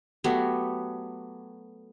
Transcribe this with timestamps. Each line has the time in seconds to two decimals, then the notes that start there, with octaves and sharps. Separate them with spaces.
0.24 F#3 A3 B3 G4